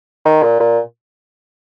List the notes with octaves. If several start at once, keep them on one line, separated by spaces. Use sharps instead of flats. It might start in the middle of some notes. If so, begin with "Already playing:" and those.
D#3
A#2
A#2